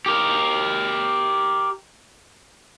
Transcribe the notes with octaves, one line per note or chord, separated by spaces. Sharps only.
G4 A#4